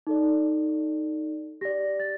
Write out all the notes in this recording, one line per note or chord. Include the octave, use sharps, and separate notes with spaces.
D#4 A4 D5
G4 D5 A#6
A6